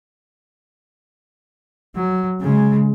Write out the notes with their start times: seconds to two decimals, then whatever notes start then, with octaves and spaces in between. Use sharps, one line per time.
1.95 F#3
2.41 C#3 G#3